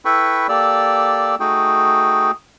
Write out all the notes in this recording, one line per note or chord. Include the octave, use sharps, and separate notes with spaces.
E4 A4 B4 G5 B5 C#6
A#3 G4 A4 D5 E6
A3 D#4 F#4 G#4 G5